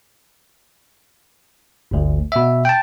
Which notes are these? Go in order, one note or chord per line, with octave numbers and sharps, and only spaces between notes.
G1 D2
B2 E5
G5 A5